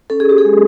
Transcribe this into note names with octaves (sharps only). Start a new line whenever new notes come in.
C#4 A4
G#4
G4
G#4
G#3